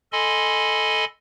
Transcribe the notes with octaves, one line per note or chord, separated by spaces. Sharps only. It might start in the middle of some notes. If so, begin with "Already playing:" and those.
A4 D#5 G#5 B5 C6